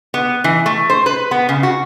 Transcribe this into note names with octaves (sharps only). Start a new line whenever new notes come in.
B3
E3
A3
C5
B4
B3
C#3
F#4